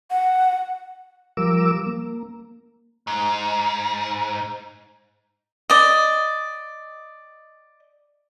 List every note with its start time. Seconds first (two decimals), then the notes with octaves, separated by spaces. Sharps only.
0.10 F#5
1.37 F3 G3 A#4 D6 E6
1.87 A#3
3.07 G#2
5.70 D5 D#5